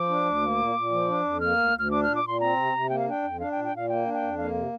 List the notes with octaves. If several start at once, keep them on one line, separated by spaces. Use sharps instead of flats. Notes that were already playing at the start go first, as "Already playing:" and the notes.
Already playing: F3 D6
D4
D2
A#3
A#2
A#2
F3
D4
F2
A#3 F6
D2
D2
F6
D4 D6
A#2 F6
D6
A#2 C6
C4 A#5
C3
C3
A#3 G5
F5
D4 G5
F2
D4 F5
A#2 G5
G5
A#2 F5
A#3 G5
D4
G5
F2
A#3 F5
C3